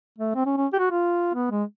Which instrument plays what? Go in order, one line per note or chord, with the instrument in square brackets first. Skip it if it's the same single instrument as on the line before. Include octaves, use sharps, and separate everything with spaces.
[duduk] A3
C4
C#4
C#4
G4
F#4
F4
B3
G#3